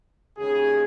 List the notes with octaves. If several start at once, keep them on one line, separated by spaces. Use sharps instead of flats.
D#2 C#3 G#3 G#4